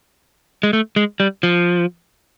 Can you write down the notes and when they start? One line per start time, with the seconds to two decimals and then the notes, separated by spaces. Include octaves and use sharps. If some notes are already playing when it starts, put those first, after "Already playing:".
0.63 G#3
0.73 A3
0.96 G#3
1.20 G3
1.43 F3